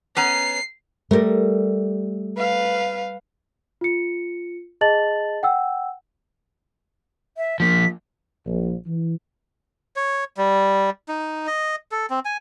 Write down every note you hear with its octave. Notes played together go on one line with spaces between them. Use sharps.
B3 C#4 A#5 C7
G3 A3 A#4
B4 F5
F4 C#7
G#4 D#5 A5 A6 F#7
F#5 G5 E6
E5
F3 A#3 B6
A#1
E3
C#5
G3
D#4
D#5
A4
C4
G#5